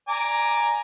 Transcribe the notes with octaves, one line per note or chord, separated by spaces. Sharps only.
D5 G#5 A#5